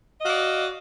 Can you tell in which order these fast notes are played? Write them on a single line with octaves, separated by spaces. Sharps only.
D#5 F5 F#4 D5